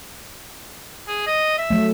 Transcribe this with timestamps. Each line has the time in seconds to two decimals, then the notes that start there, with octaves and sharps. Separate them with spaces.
1.08 G#4
1.27 D#5
1.58 E5
1.70 F#3 A3